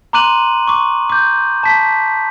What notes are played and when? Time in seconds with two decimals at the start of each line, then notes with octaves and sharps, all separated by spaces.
0.13 A#5 C6 D6 F#6 D#7 F#7
0.67 C#6 D6
1.10 D6 G6
1.63 A5 B6